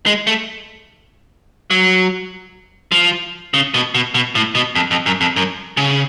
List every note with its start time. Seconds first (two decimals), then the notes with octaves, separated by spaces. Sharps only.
0.06 G#3
0.27 A3
1.70 F#3
2.92 F3
3.54 C#3
3.74 B2
3.95 B2
4.14 B2
4.35 A2
4.55 B2
4.75 F2
4.91 F2
5.06 F#2
5.21 F2
5.36 F#2
5.77 C#3